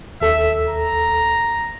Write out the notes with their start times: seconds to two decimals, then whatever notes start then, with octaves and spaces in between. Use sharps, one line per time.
0.21 D#2 A4 E5
0.68 A#5